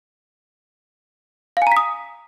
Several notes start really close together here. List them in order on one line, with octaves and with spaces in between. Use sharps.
F5 G#5 A#5 B6 D#6